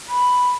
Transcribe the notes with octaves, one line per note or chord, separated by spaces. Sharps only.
B5